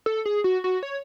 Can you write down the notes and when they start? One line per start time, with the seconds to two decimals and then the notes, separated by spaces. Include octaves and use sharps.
0.06 A4
0.25 G#4
0.44 F#4
0.64 F#4
0.83 C#5